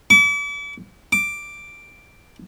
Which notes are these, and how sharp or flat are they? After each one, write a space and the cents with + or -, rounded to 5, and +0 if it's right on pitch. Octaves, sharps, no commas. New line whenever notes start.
D6 -40
D6 +5